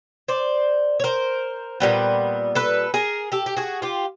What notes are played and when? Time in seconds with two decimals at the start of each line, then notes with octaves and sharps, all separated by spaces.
0.28 C5 D5
1.00 C#5
1.04 A#4 C5
1.80 A#2 G3 B3
2.55 A4 B4
2.94 G#4 A#4
3.32 G4 A4
3.46 G4
3.57 F#4 G#4
3.82 F4 G4